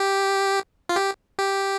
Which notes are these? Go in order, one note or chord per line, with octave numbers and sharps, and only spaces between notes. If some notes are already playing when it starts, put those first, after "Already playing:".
Already playing: G4
F4
G4
G4